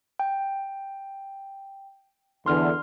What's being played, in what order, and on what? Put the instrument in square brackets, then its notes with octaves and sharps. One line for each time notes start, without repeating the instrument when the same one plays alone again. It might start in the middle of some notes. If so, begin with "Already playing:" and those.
[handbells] G5
[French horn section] E2 D3 E3 [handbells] C6 F6